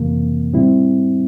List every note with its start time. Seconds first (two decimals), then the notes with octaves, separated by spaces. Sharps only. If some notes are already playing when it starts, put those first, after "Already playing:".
Already playing: F2 C3 E3 A#3
0.53 A2 G3 C4 E4